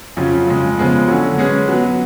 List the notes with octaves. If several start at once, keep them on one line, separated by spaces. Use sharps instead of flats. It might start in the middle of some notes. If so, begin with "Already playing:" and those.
F2 C#3 F#3 C#4 F4
F2 C#3 G#3
C#3 F3 G#3 B3
D3 F#3 C#4 F#4
G#3 C#4 G#4 B4
F#3 B3 F#4 B4